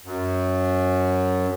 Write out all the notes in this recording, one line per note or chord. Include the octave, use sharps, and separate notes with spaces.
F#2